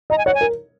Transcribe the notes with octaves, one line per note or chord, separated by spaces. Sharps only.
D#5 A#5
G#5
C#5 F#5
G#5
A#4